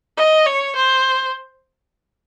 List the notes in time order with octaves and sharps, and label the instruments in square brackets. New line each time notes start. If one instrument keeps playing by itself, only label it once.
[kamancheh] D#5
C#5
C5